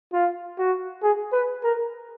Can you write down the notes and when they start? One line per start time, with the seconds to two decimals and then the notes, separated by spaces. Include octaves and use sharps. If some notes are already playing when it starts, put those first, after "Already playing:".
0.13 F4
0.58 F#4
1.03 G#4
1.32 B4
1.63 A#4